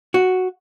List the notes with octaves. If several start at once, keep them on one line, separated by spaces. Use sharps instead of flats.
F#4